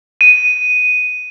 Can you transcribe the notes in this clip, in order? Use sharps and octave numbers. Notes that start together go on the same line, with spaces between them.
D#7